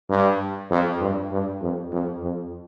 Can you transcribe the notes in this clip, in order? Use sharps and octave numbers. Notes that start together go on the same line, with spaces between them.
G2
F2
G2
G2
F2
F2
F2